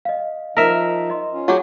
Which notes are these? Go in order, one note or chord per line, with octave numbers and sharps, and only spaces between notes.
D#5 F5
F3 D#4 A#4 E5
D#5 C6
C#4 F4
F#3 G4 G#4